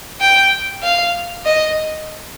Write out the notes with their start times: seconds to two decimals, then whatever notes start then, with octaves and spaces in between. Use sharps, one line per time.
0.21 G5
0.83 F5
1.45 D#5